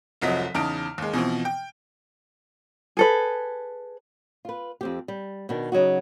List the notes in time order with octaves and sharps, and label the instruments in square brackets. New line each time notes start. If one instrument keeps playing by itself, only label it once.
[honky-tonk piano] F1 C2 F3 F#3 D#5 B6
E2 C#3 D#4 A5 F6 D7
D#2 G#3
B2 E3 F3 C4
G5
[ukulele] G#4 A4 B4
[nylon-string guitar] F4 B4
F2 C4 G4
G3
B2 D#3 D4
C#3 F#3 D#4 F#4